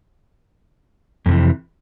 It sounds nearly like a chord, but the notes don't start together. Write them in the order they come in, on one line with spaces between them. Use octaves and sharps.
F2 C3 E3